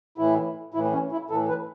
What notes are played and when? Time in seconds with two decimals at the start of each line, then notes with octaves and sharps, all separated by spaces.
0.18 A2 E3 E4
0.74 A2 E3 E4
0.93 C#4
1.12 E4
1.30 A2 E3 A4
1.48 B4